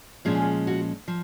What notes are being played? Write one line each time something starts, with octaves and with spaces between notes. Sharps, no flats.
A#2 F3 G#3 C#4 G#4
F#4
F3